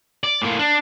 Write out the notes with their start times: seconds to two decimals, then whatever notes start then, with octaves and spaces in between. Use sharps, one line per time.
0.24 D5
0.42 A2 A#3
0.59 D4